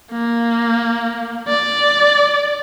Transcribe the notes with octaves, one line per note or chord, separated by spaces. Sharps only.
A#3
D5